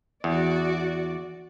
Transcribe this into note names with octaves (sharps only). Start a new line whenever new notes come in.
E2 F#4 D5